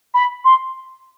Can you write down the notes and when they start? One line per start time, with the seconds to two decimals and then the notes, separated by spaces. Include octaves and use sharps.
0.14 B5
0.44 C6